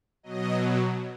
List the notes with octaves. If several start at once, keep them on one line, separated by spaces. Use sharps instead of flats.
B2 F#3 D#5